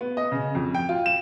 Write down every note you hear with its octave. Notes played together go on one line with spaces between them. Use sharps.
B3
D#5
C#3
F2
G5
F4
E7